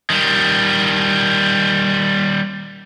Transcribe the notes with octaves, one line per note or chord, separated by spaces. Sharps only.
D#3 G3